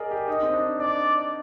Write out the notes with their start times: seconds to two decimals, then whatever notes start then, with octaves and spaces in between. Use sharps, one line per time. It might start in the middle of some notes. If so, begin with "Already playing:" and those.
Already playing: G#4 A#4 D5 D#5
0.11 G4
0.28 D#4 D#5
0.43 C4
0.53 D4
0.79 D4 D5